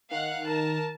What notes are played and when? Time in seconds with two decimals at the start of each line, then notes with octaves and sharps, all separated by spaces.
0.11 D#3 F5 F#5 F#6
0.46 A#4 A5